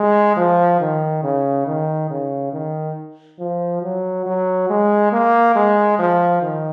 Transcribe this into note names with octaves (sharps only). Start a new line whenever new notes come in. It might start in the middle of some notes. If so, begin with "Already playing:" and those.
Already playing: G#3
F3
D#3
C#3
D#3
C#3
D#3
F3
F#3
F#3
G#3
A#3
G#3
F3
D#3